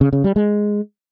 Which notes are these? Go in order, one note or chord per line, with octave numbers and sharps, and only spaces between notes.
C#3
C#3
G3
G#3